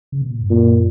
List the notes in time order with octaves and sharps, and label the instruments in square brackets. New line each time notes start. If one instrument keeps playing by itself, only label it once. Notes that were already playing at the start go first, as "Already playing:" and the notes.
[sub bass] C#3
B2
A#2
G2
[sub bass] F#2 [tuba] A#2